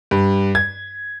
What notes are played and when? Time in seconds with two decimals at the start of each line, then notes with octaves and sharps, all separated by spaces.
0.11 G2
0.55 G#6